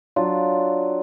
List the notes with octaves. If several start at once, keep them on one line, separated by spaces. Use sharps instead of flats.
F#3 D4 F4